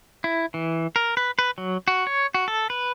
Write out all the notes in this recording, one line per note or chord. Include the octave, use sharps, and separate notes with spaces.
E4
E3
A#4
B4
B4
F#3
F#4
C#5
F#4
A4
B4